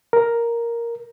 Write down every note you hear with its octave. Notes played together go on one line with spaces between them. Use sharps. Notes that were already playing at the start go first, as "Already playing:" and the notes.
A#4